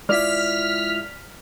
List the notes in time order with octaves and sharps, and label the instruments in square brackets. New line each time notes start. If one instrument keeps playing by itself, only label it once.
[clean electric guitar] G#3 E4 F4 [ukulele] D5 [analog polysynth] F6 B6